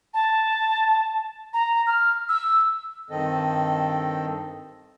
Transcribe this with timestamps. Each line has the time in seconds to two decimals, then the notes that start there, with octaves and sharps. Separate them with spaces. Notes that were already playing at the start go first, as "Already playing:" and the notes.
0.14 A5
1.53 A#5
1.87 F6
2.29 E6
3.10 G2 D#3 C4 A4 D#5